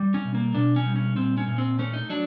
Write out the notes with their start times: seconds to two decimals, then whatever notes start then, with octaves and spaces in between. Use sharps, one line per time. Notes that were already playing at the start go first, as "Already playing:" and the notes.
Already playing: G3
0.14 C#4
0.25 B2
0.35 A#3
0.55 B2 D4
0.76 C#4
0.86 G3
0.96 C#4
1.16 A#2 C4
1.38 C#4
1.48 A#2
1.58 C4
1.79 A3 C#4
1.93 D#4
2.10 F#3 D4